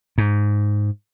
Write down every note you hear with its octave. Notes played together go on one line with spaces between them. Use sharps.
G#2